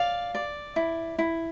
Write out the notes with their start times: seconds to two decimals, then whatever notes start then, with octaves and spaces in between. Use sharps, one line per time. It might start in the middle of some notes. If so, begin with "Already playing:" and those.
Already playing: D5 F5
0.35 D5
0.76 E4
1.19 E4